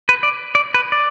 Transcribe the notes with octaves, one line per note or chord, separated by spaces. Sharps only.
B4
D5
D5
B4
D5